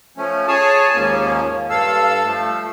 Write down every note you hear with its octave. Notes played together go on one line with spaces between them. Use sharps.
F3 A3 C#4
G#4 C#5 G#5 A5
D#2 G#2 F3 A#3 C#4
G2 A4 F5 E6
F3 A3